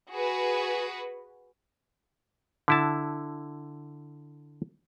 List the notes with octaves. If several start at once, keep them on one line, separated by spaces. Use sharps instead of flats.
F#4 G#4 B4
D3 E4 A5